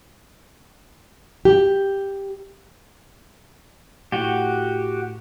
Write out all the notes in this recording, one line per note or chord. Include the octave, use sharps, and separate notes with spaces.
G4
A2 F#4 G4